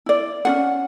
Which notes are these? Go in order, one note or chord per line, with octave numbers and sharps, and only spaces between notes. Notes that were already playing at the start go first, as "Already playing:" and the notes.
E4 D5
C#4 F4 F#5